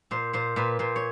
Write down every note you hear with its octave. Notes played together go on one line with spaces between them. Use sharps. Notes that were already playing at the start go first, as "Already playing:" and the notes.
A#2 C5
A#2 C5
A#2 B4
A#2 C5
C#5